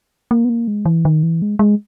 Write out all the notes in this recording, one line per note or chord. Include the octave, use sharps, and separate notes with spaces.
A#3
B3
A#3
G#3
E3
D#3
E3
G#3
G#3